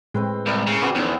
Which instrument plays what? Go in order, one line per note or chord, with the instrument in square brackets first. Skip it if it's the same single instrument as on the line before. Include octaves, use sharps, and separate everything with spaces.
[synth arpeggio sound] A2 G#3 [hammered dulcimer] C4 B4 G5
[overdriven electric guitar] C2 [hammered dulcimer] G3 A#4
[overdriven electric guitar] C#3 [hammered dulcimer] C4
[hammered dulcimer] F3 B3 C4 [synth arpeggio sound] F#4 C#6 D6
[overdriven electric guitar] E2 [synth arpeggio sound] C#4 D#4 A4